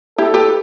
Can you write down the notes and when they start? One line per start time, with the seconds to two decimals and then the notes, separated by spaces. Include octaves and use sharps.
0.18 E4 G4 A4
0.34 G4 B4